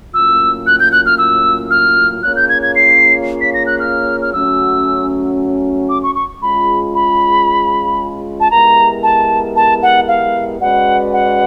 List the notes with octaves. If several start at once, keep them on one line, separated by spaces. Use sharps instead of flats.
A2 F#3 A#3 C#4 F4 E6
F#6
G6
F#6
F6
E6
F6
A#3 C#4 F4 G#4 C#5 F#6
G6
G#6
G#6
C7
B6
A#6
F#6
F6
F6
F#3 A3 C#4 F#4 E6
D6
C#6
C#6
G#3 C#4 F4 G#4 B5
B5
A5
G#3 B3 E4 G4 A#4 A#5
A5
A5
F#5
F5
G#3 C#4 F#4 B4 D5 F#5
F#5